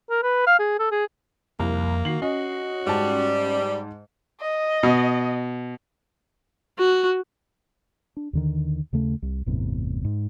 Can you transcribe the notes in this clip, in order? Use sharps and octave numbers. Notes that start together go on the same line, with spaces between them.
A#4
B4
F5
G#4
A4
G#4
C2 F2 A#3
D#3 F#4 C7 F#7
C#4 F#4 D#5
G#2 G3 A5
D#5
B2
F#4
D4
D#2 D3 D#3
D#2 C#3 A3
C2
G1 E2 A2 C3
G#2